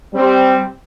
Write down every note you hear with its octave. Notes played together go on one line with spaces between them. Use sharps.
G3 C4